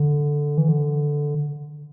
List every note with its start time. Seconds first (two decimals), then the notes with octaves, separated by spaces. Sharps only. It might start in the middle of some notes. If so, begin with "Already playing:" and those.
Already playing: D3
0.58 E3
0.69 D3